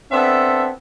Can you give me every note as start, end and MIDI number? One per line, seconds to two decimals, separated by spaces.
0.12 0.69 59
0.12 0.69 60
0.12 0.69 62
0.12 0.69 69
0.12 0.69 76